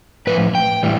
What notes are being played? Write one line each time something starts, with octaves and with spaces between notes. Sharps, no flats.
A2 F3 B4
G5
A2 E3 G3